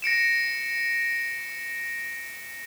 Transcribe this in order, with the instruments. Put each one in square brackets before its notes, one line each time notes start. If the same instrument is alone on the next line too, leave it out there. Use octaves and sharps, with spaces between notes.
[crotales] A#6 C#7 D7 E7